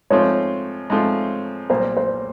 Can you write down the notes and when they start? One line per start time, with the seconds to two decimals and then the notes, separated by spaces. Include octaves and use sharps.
0.10 G#2 F3 A3 C4 F4 C#5
0.90 G#2 F3 A3 C4 F4
1.70 B1 A#2 G3 A#3 C5
1.97 C5